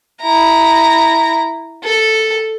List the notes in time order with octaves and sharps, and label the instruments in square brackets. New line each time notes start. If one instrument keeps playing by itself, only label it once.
[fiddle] E4 A#5
A4